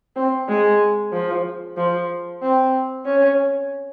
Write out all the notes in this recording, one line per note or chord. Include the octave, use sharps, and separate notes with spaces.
C4
G#3
F3
F3
C4
C#4